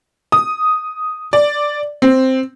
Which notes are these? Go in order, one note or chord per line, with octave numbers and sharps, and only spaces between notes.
D#6
D5
C4